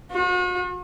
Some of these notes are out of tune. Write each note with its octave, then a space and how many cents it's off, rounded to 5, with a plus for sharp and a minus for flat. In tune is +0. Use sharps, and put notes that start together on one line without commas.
F#4 -45